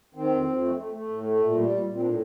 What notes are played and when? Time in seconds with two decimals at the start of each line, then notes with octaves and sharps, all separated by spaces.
0.14 D#3 C4
0.30 F2
0.46 F2
0.61 A3
0.76 A3
0.92 A3
1.08 A2
1.24 A3
1.39 A#2
1.55 G3
1.70 A#2
1.86 A#2
1.94 C4
2.01 A2 D4